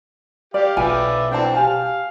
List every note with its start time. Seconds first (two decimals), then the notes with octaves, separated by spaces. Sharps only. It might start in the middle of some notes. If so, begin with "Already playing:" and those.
0.54 G4 D5 F5
0.77 B1 F4 B4 D5 E5 G5 G#5
1.31 E3 C4 D4 F#5 G5 A5
1.54 G4 F5 G#5 A5